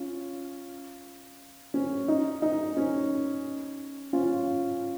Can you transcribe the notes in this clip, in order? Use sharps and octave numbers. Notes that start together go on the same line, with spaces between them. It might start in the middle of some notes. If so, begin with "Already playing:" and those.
Already playing: C#4 F4
C#4
D#4
D#4
C#4
C#4 F4